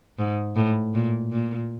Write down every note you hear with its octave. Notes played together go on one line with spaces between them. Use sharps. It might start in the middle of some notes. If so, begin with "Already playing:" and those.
G#2
A2
A#2
A#2